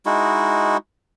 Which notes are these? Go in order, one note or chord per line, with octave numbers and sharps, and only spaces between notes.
G#3 D#4 E4 F#4